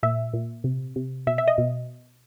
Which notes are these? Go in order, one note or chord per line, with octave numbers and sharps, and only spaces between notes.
A#2 E5
A#2
C3
C3
B2 E5
E5
D#5
B2